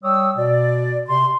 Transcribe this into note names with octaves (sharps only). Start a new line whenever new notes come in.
G3 C#5 G5 D#6 E6
B2 D5
C3 C6